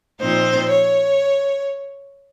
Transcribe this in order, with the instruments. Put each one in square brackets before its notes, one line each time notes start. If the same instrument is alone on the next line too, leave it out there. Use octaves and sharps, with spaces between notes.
[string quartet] A#2 F3 C4 D#4 C5
C#5